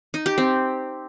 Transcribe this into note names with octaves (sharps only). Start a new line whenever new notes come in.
D#4
G4
C4